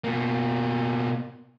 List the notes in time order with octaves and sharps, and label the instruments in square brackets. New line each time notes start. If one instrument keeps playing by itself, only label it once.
[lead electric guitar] B2 A#3